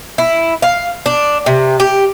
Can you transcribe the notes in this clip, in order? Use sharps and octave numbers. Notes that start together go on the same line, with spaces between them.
E4
F5
D4
C3
G4